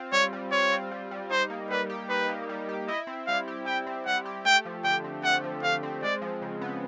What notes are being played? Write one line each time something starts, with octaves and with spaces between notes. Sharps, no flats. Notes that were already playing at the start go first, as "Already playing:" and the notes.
Already playing: C4 F4
G3 C#5
G3
F4 C#5
C4
G3
G3
D#4 C5
A#3
G3 B4
G4
D#4 B4
A#3
G3
G4
E4 D#5
C4
G3 F5
G4
E4 G5
C4
G3 F#5
G4
A3 G5
F3
D3 G5
C4
A3 F#5
F3
D3 F5
C4
G#3 D5
F3
C#3
B3